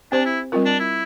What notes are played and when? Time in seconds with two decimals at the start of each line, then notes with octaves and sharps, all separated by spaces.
0.12 C4 D4 G4 C5
0.25 E4
0.52 G3 C4 F4 A#4
0.66 D4
0.80 E4